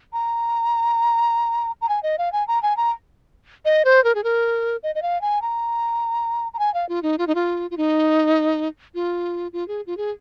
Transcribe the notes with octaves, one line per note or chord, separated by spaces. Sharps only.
A#5
A#5
G#5
D#5
F5
G#5
A#5
G#5
A#5
D#5
C5
A#4
G#4
A#4
D#5
D#5
F5
G#5
A#5
A#5
G#5
F5
F4
D#4
F4
D#4
F4
F4
D#4
F4
F4
G#4
F4
G#4